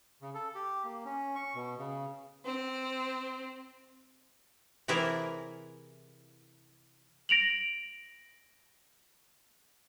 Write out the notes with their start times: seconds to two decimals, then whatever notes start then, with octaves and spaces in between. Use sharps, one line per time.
0.21 C#3
0.34 A4
0.55 G4
0.84 A#3
1.05 C#4
1.36 C#6
1.55 B2
1.79 C#3
2.45 C4
4.88 C3 E3 E4 G#4 A#4 D5
7.29 A#6 D7 F7 F#7